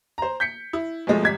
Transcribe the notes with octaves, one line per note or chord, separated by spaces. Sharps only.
C5 A#5
G6 B6 C#7
E4
B1 F3 G#3 A3
G#1 G3 G#6 B6